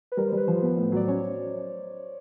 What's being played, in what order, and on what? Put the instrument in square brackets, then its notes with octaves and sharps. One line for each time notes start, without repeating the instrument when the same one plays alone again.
[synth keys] B4
[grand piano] G3 [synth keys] A#4
[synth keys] C5
[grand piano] G3
[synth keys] B4
[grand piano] F3 [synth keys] C5
[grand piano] B3
A2
[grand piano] F#3 [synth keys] D5
[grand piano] C#4 [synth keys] C#5